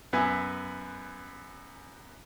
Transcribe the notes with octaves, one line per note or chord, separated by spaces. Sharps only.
F#2 B3 B4 E5 G#5